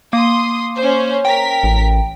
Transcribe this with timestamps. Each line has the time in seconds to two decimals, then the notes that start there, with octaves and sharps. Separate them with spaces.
0.13 A#3 C6 D#6
0.75 C#4 C5
1.25 A#4 G5 B6
1.63 A1